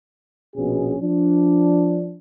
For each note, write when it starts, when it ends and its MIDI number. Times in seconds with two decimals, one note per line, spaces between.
0.55 0.95 34
0.55 0.95 47
0.55 0.95 59
0.55 0.95 61
0.55 0.95 68
1.01 2.17 53
1.01 2.17 62